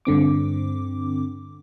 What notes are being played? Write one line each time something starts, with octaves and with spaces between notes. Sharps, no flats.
G2 D3 C4 D6